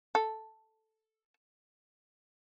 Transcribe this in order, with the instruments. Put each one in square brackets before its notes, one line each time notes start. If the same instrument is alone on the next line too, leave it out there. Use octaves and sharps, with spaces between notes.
[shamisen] A4